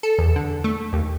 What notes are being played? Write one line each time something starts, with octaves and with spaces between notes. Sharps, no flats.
A4
E2
D3
A3
D#2